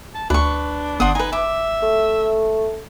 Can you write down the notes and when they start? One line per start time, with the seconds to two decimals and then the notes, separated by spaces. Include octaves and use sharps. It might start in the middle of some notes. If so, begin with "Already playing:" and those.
0.15 A5
0.30 D2 D4 B4 C#6
1.00 G1 C5 F#5 D#6
1.15 D#4 B4 G#5
1.33 E5 D6
1.82 A3